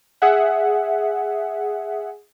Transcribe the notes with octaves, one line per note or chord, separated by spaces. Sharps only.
G#4 E5 F#5